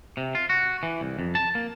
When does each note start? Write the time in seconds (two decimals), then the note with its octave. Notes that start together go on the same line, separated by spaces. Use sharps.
0.17 C3
0.35 F4
0.50 F#4
0.83 E3
1.01 C2
1.19 F2
1.35 A5
1.55 A#3